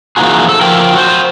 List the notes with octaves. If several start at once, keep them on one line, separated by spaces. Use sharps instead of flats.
E3 F3 A#3 D#4 F#4 G#4
A4
F3 A#4 G5
F#4 C5